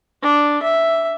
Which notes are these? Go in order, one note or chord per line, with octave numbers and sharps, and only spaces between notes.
D4
E5